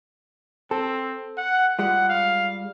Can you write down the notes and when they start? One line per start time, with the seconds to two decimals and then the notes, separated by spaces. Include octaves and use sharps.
0.71 C4 A4
1.37 F#5
1.79 G3 G#3 F4 F#5
2.09 F5